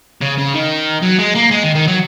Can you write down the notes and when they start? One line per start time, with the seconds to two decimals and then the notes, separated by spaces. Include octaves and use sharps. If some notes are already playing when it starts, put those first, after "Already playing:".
0.22 C#3
0.38 C#3
0.54 D#3
1.02 F#3
1.19 G#3
1.35 A#3
1.51 G#3
1.63 D#3
1.75 D#3
1.87 F#3